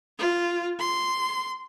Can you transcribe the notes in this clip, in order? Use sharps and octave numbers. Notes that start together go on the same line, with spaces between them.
F4
C6